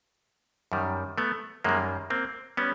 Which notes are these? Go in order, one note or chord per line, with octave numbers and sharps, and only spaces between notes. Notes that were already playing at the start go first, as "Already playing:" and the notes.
F#2 D#3 G3
A3 B3
F#2 D#3 G3 G#3 A#3
A#3 C4
G3 B3 C#4